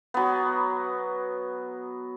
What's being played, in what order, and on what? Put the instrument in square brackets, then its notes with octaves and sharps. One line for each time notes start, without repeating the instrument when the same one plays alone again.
[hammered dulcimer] F#3 B3